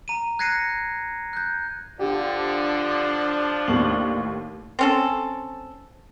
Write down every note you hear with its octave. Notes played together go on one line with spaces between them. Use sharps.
A#5 D#7
F#6 G#6 A#6 C7 C#7 D#7
F#6 G6
D3 F3 D4 G4
D#2 A2 F#7
C4 C#4 A4